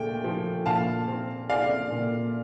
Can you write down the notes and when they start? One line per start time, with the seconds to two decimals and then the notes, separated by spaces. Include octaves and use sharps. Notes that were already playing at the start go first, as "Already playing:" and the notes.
Already playing: A#2 A3 G5
0.24 F3
0.66 A#2 F5 A5
1.08 C4
1.50 C4 D5 F5
1.91 A#2